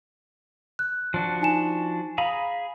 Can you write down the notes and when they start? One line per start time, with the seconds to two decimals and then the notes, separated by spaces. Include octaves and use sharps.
0.79 F#6
1.14 F3 D4 F#4
1.41 D#4 G#5 E7
2.18 G#4 F5 A#5 B5